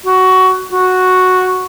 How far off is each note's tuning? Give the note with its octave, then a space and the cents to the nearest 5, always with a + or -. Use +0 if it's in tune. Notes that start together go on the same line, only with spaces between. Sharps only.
F#4 +15
F#4 -5